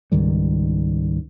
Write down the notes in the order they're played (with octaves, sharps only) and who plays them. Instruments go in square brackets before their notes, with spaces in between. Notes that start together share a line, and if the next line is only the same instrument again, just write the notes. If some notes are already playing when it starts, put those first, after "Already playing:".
[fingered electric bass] C#2 G#2 D#3 G3